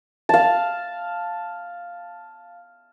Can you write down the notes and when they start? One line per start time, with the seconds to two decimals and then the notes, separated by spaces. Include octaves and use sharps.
0.29 F5 A5